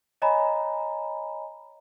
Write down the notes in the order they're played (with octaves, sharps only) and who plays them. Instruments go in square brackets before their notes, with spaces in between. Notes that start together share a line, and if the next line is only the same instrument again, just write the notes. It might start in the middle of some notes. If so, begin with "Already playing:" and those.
[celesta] C#5 D#5 G#5 A#5 B5